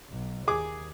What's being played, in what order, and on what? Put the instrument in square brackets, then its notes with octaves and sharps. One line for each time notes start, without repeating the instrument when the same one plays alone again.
[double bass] B1
[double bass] D#2 [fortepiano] G#4 D6